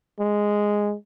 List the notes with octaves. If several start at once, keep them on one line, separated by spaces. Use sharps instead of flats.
G#3